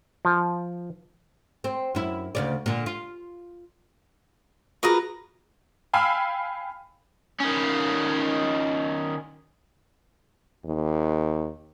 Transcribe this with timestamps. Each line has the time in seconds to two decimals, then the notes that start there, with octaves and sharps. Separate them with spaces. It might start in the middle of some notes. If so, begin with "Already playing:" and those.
0.25 F3
1.64 C4
1.95 F#2 E4
2.35 D2 C#3 D5
2.66 A#2 D3
2.86 F4
4.83 F4 F#4 G#4 A#4 B4 A#5
5.93 F5 G5 G#5 B5 E6 F6
7.40 D#3 C#4
10.65 D#2